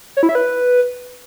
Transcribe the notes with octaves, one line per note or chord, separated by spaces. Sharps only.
C#5
E4
E5
B4